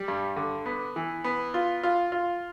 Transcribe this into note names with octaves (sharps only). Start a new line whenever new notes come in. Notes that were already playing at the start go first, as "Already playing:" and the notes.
Already playing: G3
G2
D3
B3
E3
B3
F4
F4
F4